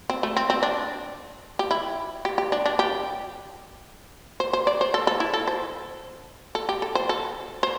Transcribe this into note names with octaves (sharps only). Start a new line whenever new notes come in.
C4
A3
C4
C4
D4
G4
E4
G4
G4
D4
D4
G4
C5
C5
D5
C5
A4
A4
E4
A4
C5
A4
G4
A4
C5
A4
C5